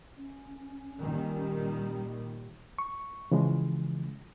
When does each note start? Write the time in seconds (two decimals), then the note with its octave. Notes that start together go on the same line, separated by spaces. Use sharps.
0.17 C#4
1.02 A#2 D#3 G3
2.79 C#6
3.32 C#3 E3 F3 G#3